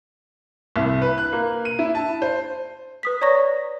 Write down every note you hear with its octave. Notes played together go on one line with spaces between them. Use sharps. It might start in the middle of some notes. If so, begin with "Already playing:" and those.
C2
B4
F#6
A#3
D#7
E4
A5
C5
B4 D#6 B6
C#5 D5 A#5 C#6 A#6